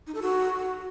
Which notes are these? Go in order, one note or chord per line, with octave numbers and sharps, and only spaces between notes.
D#4
A4
F#4